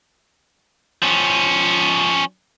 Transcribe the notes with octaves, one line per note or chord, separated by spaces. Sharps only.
F3 C#4